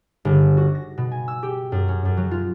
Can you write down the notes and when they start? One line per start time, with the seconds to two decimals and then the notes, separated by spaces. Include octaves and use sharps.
0.25 G1
0.57 F#4
0.75 A#6
0.98 B2
1.12 G#5
1.28 E6
1.43 G4
1.72 F#2
1.88 C#4
2.05 F#2
2.17 F#3
2.31 F4